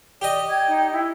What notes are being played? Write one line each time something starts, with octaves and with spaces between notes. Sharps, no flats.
G4 D5 D#5
G5 G#6
D#4
E4